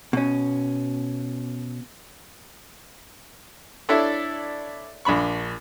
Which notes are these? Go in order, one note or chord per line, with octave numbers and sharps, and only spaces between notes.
B2 C#4
D4 E4 A4 C#5 D5 E5
A#1 D4 B5 C#6